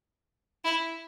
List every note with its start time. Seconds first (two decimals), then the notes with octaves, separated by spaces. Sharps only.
0.64 E4